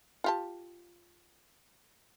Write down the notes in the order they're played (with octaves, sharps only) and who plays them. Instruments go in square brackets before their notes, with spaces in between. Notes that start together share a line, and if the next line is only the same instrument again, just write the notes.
[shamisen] F4 G4 A5